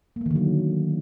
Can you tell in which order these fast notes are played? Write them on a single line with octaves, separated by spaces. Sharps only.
A#3 A3 D#3 D3 F#3